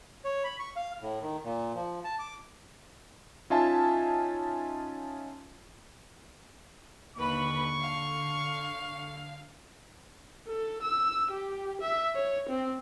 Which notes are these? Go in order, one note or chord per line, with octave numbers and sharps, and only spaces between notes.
C#5
B5
C#6
F5
A2
D#3
A#2
F3
A5
D6
C#4 D#4 F4 E5 G#5 A5
D#2 D3 B4 B5 C#6
F5
A4
E6
G4
E5
C#5
C4